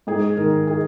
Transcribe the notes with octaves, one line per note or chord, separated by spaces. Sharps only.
G#2 G#4
D#3 A#4
G#4